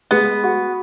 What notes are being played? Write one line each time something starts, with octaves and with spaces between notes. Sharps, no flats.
G#3 B3
F#4